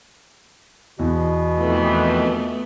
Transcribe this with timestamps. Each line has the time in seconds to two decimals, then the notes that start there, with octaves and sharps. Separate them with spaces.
0.99 E2 B2
1.57 F2 D#3 E3 A3 B3